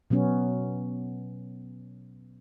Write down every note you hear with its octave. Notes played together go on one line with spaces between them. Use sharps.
B2 F#3 B3 C#4